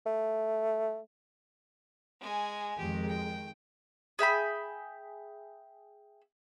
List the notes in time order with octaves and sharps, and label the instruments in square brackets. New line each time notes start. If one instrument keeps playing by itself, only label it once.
[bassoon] A3
[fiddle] G#3 G#5
[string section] F2 D#3 G#3 [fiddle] G4
[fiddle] G5
[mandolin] G#4 E5 G5 B5